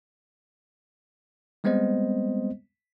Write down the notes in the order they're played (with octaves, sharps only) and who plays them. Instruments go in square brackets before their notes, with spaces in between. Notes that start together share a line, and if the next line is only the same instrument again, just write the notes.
[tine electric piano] G3 G#3 B3 C4 C5 D#5